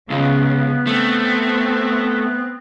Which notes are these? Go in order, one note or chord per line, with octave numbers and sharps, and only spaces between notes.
C#2 C#3 B3
A3 C4